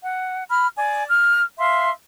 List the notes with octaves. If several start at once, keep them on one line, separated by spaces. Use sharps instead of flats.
F#5
B5 F6
D5 G#5
F6
E5 F5 C6